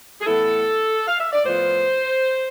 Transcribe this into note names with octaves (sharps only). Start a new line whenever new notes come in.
G#4
A2 E3 B3 E4 A4
F5
E5
D5
A2 F3 B3 F4 C5